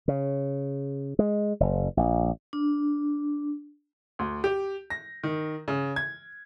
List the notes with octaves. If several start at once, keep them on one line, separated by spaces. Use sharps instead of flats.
C#3
G#3
F#1
A#1
D4
D2
G4
A#6
D#3
C#3
G#6